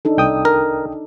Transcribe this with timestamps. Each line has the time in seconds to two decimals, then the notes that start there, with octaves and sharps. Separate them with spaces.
0.05 D4 D#4 A4
0.17 C2 G5 D#6
0.45 A#4